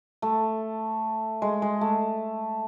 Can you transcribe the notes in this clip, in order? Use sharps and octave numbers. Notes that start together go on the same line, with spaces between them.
A3
G#3
G#3
A3